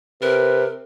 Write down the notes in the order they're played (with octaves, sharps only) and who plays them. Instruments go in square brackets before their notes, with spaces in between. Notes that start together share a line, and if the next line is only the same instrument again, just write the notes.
[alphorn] C3 [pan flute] A#4 [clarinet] B4